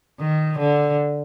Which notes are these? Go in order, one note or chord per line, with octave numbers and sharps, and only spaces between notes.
D#3
D3